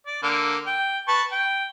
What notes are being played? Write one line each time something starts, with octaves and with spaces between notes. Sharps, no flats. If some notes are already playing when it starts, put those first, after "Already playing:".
D5
D3 A#3
G5
B4 A5 C#6
G5